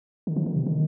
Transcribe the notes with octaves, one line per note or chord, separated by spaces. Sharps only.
D#3
F3
D#3
C3
D#3